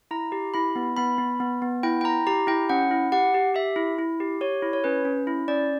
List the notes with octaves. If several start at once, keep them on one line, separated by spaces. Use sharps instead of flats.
E4 A#5
G4
E4 B5
B3
B3 B5
B3
B3
B3
E4 G5
G5
E4 A#5
G4 A#5
E4 G5
C#4 F#5
E4
G4 F#5
G4
G4 E5
E4
E4
G4
G4 C#5
E4
C#5
C#4 B4
C#4
E4
C#4 D5